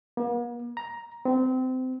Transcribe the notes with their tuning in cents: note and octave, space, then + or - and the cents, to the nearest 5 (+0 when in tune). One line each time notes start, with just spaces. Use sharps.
A#3 +45
A#5 +10
C4 -25